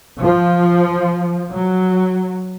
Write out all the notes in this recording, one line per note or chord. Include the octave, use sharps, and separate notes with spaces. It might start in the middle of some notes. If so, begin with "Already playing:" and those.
F3
F#3